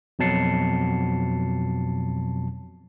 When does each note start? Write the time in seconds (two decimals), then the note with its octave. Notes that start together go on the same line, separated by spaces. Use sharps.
0.19 F2 B2 F#3 A5 C7 C#7